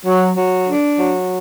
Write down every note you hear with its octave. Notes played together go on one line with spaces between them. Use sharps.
F#3
F#3
D4
F#3